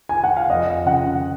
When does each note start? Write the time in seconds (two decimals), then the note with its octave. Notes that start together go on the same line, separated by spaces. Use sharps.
0.09 G#5
0.24 F#5
0.37 F5
0.50 F2 D#5
0.86 C#3 F#5